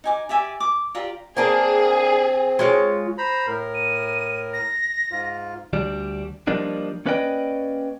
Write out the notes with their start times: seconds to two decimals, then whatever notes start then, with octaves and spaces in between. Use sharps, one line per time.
0.04 D#4 G#5 D6
0.29 G4 D5 E5 G#5
0.60 D6
0.95 F4 G4 D5 A#5
1.37 A#3 C4 D4 G#4 A#4
2.59 G#3 F4 C#5
3.18 C5 A#5 B5
3.47 A2 A#4
3.74 D#7
4.53 A#6
5.11 G#2 F4
5.73 D2 G3 D4
6.47 F3 G3 A#3 D4 D#4
7.06 A#3 C#4 B4 D5 D#5 G5